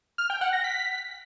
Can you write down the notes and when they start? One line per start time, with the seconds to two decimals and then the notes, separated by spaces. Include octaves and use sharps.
0.18 F6
0.30 G5
0.41 F#5
0.53 A#6
0.64 B6